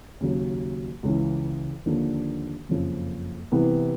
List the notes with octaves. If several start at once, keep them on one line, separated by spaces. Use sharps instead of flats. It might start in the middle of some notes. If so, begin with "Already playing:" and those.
D#2 C#3 F#3
C#2 C#3 E3
D#2 D3 F3 A#3 D4
F#1 F2 C#3 F3
C3 E3 G3 B3 E4